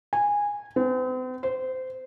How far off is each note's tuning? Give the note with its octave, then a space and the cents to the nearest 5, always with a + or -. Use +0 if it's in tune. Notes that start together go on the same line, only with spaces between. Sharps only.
G#5 -15
C4 -45
C5 -20